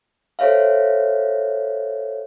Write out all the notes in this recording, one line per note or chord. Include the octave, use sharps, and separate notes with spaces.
A4 C5 C#5 E5 F5